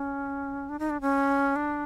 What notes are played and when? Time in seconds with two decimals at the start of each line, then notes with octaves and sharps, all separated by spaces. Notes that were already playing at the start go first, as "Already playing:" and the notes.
Already playing: C#4
0.69 D4
0.79 D#4
0.90 D4
1.01 C#4
1.56 D4